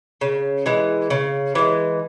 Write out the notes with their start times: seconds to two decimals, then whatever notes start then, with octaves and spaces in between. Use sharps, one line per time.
0.21 C#3
0.66 E3 G#3
1.10 C#3
1.55 E3 G#3